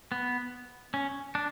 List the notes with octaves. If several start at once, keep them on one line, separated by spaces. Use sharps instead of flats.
B3
C#4
D4